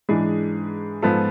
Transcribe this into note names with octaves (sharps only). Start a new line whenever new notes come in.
G#2 E3 G#3 D4 G#4
G#2 F3 B3 F4 A4